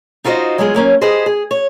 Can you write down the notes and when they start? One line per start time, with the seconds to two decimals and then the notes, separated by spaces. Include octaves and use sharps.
0.24 D#4 F4 F#4 B4 C5 D#5
0.58 F#3 G#3 B3 F4 G#4
0.74 F#3 A#3 C#4
1.01 G4 G#4 B4 C5 D#5
1.26 G#4
1.51 C#5